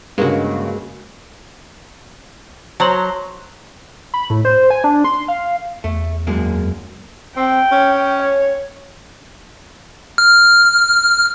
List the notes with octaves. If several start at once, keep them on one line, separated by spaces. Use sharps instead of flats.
G2 C#3 G#3 A#3 F#4
F#3 C5 C#5 A5 A#5 C6 F#7
B5
A2
C5
G#5
D4
C6
F5
E2 A3
F#2 G#3 A#3
C4 G5
C#4
C#5
F6